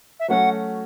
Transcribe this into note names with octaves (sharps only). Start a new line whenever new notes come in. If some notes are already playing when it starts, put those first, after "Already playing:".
E5
F#3 A3 C#4 F#4 F#5